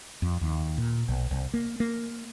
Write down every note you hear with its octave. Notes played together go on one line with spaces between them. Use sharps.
F2
D#2
A#2
B1
C2
A#3
A#3